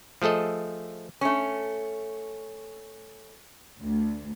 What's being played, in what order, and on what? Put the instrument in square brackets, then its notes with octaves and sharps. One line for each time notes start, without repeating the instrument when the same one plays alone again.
[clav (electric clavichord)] F3 A3 G#4 A4 D#5
[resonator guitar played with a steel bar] A3 C#4
[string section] D2